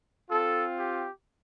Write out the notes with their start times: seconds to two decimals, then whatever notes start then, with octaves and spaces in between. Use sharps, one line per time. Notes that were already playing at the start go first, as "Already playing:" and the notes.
0.30 C4 F4 A4
0.78 G4